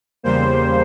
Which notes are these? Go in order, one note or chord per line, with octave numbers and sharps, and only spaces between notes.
E2 C#3 G3 A#3 C5